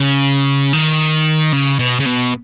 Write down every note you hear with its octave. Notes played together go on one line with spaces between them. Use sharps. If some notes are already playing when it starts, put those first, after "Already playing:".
Already playing: C#3
D#3
C#3
B2
C#3
B2